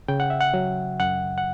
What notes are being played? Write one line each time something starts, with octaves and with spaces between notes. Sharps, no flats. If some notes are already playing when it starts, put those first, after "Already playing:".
C#3 G5
F#5
E5
F#5
F#3
F#2 F#5
F#5